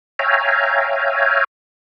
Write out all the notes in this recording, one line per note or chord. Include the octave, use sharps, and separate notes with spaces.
C#5 E5 F5 G5 G#5 A#5